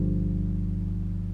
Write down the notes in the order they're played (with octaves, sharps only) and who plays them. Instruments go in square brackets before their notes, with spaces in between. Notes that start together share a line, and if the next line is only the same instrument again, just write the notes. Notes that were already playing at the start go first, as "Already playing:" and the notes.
Already playing: [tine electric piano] G1 G2 F3